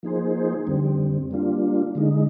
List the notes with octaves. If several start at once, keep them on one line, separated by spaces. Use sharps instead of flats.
F3 A#3 D#4 G#4 C5
F2 D3 G3 C4
G3 A#3 D4 F4
D3 G#3 D#4